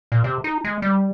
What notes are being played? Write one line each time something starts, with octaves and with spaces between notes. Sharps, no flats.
A#2
C3
D#4
G#3
G3